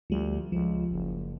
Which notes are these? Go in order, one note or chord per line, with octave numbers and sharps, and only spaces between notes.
D2 F3 G3
C#2 F3
F#1